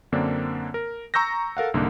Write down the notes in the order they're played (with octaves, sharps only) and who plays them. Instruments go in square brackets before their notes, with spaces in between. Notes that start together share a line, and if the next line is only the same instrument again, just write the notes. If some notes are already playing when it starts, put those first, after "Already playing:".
[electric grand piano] F#2 D3 A#3 C4 D4
A#4
A#5 C#6 E6 G6 A#6
A4 A#4 F5 F#5
C2 G#2 D3 A#3